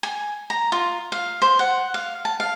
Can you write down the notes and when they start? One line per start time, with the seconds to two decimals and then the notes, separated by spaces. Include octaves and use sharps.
0.03 G#5
0.50 A#5
0.72 F4
1.12 F5
1.42 C5
1.59 F#5
1.94 F5
2.25 A5
2.40 F5